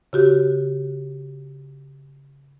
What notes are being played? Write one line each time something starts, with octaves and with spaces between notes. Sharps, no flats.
C#3 F#4 G4